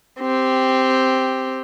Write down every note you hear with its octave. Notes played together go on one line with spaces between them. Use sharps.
C4 G4